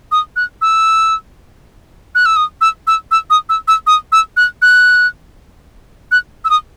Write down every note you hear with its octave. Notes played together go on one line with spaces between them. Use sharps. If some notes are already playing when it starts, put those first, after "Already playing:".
D#6
F#6
E6
F#6
E6
D#6
E6
E6
E6
D#6
E6
E6
D#6
E6
F#6
F#6
F#6
E6
D#6